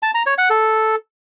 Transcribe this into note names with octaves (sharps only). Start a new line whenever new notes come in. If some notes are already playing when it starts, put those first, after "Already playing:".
A5
A#5
C#5
F#5
A4